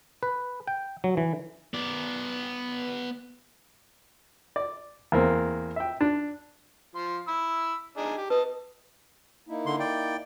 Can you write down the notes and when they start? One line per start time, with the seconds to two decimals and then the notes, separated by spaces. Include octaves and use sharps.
0.23 B4
0.67 G5
1.04 F#3
1.17 E3
1.74 B3 D5
4.56 D5
5.12 E2 A#3 C4
5.76 E5 G5
6.01 D4
6.95 F3 C6
7.28 B5 E6
7.97 D4 D#4 G#4
8.17 G4
8.30 B4 D#5 A5
9.48 A#3 D#4 E4
9.66 D3 C6
9.80 D5 G5